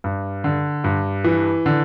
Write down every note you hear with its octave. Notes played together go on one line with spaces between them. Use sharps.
G2
D3
G2
E3
D3